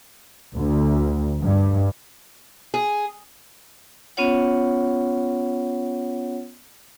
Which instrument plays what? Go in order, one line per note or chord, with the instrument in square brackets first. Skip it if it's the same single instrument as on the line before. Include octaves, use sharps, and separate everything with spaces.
[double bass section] D2
G2
[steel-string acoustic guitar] G#4
[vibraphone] B3 C#4 F4 C#5 F#5